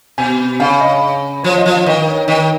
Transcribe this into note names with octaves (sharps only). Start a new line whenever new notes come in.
B2 G#5
C#3 F5
D#5
F3 C#5
D#5
F3
F5
D#3 D#5
C#5
D#3 D#5